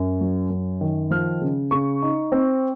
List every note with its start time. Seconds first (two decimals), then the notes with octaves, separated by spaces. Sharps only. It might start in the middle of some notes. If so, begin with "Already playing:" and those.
Already playing: F#2
0.21 F#3
0.50 F#2
0.81 D#3
1.11 F3 F6
1.41 C#3
1.71 C#3 C#6
2.02 D#4
2.32 C4